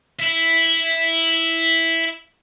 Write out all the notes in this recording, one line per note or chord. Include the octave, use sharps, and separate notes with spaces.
E4 E5